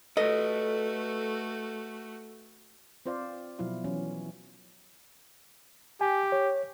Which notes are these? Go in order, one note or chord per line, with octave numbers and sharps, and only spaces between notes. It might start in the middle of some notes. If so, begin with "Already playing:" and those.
A3 F#4 A4 B4 D#5
C4 F4 C5 D5 F5
B2 F3 F#3 E4 F5
E3 F#3 C#4
G4 G#5
C#5